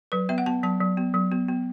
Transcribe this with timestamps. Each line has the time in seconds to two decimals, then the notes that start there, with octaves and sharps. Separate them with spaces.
0.12 F#3 B4
0.29 B3 E5
0.38 F#5
0.46 B3 A5
0.63 F#3 A5
0.81 F#3
0.97 B3
1.14 F#3
1.32 B3
1.48 B3